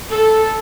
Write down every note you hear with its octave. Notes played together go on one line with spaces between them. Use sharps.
A4